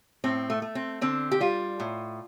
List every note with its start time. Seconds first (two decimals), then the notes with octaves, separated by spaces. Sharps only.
0.24 A2 C4
0.50 A3
0.62 A3
0.75 C4
1.01 D3 C4
1.31 G4
1.40 G3 F4
1.80 A2